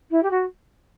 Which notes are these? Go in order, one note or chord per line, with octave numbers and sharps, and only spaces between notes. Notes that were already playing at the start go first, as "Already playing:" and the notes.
E4
G4
F#4